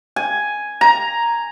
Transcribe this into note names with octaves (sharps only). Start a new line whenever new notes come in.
G#5
A#5